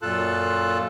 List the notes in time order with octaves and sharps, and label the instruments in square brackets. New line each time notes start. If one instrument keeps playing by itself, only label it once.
[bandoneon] F#2 A#2 F4 A4 A5 F#6